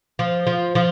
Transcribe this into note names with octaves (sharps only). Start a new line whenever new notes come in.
F3
F3
F3